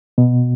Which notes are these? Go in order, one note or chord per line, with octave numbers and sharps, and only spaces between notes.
B2